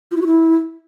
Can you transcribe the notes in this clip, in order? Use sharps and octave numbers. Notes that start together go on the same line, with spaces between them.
F4
E4
F#4
E4